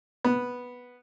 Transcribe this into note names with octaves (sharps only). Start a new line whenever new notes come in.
B3